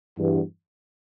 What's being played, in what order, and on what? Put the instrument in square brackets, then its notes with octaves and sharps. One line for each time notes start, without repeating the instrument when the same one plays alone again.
[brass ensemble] E2 G2